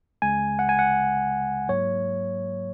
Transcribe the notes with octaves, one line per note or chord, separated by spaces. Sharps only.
C#2 C#3 G#3 G#5
F#5
G#5
F#5
G#2 F#3 A#3 C#5